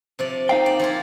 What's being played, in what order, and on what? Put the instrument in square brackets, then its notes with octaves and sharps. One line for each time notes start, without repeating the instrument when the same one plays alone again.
[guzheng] C3 F3 D5
[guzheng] A#3 [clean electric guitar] D#4 F5 G5
[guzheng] D5
F3 E4 F4